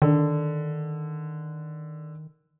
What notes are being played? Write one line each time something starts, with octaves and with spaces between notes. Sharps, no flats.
D3 D#3